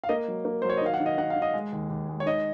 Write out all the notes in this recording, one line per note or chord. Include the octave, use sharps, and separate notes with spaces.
F5
A#3 D#5
F#3
A#3
F#3 C5
C#5
D#5
D#3 F5
F#5
D#3
D#5
D#3 F#5
F5
D#3
D#5
G#3
D#2
D#2
G#3
C#5
D#3 D#5